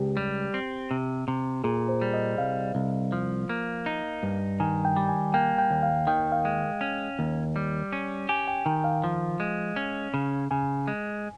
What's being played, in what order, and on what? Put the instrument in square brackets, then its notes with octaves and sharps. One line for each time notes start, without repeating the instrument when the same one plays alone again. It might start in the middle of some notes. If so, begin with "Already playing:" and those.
Already playing: [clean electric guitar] C#2 [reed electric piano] G4
[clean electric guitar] G3
C4
C3
C3
[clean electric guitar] A#2 [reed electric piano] G#4
[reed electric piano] C5
[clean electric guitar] G3
[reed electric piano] D#5
[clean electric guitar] C2 [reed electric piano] F5
[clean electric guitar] C2
F3
A#3
D#4
G2
[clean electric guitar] D#3 [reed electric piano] G#5
[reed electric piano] G5
[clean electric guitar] G3
[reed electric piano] G#5
[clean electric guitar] A#3 [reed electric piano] G5
[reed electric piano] G5
[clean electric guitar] D#2
[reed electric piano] F5
[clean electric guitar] D#3 [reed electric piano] G5
[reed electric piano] F5
[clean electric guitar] G#3
C#4
D#2
G3
C#4
[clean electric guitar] G4 [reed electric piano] G#5
[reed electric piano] G5
[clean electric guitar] D#3 [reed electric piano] G5
[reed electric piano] F5
[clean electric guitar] F3
G#3
C#4
C#3
[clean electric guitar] C#3 [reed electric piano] G#5
[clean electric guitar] G#3